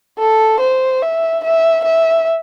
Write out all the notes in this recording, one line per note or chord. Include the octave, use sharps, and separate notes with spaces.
A4
C5
E5
E5
E5